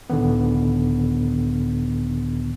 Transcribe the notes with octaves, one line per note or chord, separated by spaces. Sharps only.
C#2 A2 D3 D#3 B3